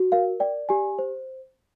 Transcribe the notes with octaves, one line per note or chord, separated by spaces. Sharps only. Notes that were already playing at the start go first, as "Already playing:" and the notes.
Already playing: F#4
A#4 F5
D5 G5
G4 G#5
C5